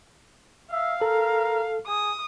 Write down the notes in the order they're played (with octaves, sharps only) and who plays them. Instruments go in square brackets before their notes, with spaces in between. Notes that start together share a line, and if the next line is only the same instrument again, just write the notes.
[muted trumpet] E5 [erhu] F5
[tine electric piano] A4 [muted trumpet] A#4
[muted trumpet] G#4 [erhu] D#6